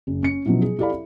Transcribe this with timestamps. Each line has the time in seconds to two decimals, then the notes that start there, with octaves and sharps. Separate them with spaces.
0.07 F#1
0.23 C#4 C#7
0.45 B2 F3 F#3 C#4 E4
0.62 G#4
0.79 E4 G4 A4 D5 F5 B5
0.92 E4